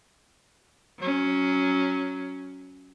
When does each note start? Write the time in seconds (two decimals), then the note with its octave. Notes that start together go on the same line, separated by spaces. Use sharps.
0.99 F#3 C#4